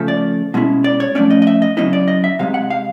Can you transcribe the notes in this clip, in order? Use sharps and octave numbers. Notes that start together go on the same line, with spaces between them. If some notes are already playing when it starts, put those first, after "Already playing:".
Already playing: C#3 F3 A3
D5
B2 G#3 C#4 E4
D5
C#5
F3 A3 C#4 D5
D#5
D#5
E5
D#5
C#3 F#3 A#3 C#4 E4 D#5
D5
D#5
E5
C3 F3 G#3 F5
F#5
F5